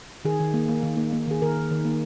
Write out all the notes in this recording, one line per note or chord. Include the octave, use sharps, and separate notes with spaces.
D#3 G#4
D#3
A#3
A#3
D#3
A#3
A#3
D#3 G#4
D#3 A#4
D#3
D#3
A#3